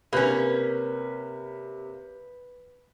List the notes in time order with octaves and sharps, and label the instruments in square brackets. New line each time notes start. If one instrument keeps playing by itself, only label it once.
[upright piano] C3 F#6 G6 [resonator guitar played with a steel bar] A#3 C#4 [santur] B4